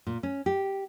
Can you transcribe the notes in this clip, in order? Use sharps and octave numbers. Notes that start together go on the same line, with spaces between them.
A#2
C#4
G4